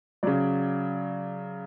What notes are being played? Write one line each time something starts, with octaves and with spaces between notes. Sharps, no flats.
C#3 F#3 D5